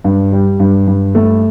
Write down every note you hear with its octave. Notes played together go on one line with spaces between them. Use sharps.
G2
G3
G2
G2
A3